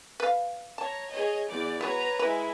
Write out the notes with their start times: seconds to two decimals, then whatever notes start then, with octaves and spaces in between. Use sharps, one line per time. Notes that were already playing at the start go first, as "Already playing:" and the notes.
0.20 B4 F5
0.78 C#5 A5 A#5
1.09 G#4 C#5 D#5
1.47 E2 D5
1.81 B3 F#4 B4 C#5 A#5
2.19 G#3 E4 B4